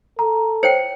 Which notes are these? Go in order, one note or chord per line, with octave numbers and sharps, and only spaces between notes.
A4 A#5
C5 C#5 G5 C#7